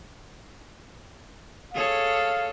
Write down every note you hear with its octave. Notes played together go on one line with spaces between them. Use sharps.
G#4 A4 C#5 F5